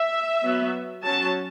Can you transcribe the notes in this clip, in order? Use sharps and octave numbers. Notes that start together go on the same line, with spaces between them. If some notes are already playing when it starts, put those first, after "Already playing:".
Already playing: E5
F#3 B3
F#3 C#4 A5